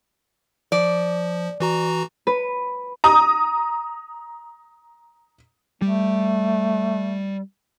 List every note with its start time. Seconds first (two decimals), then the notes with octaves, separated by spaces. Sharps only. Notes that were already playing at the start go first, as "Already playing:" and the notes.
0.72 F3 D5
1.60 E3 F#4 A#5
2.27 B4
3.04 A#5 D#6
5.82 G3 A3